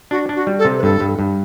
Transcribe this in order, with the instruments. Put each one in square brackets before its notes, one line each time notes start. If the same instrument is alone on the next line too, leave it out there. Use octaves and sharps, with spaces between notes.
[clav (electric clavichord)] D4 [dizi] F#4
[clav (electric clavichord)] D4
[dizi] F#4
[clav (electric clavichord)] G3
[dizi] A4
[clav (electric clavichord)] C3
[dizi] B4
[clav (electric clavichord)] G2 [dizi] A4
[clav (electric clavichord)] G2
G2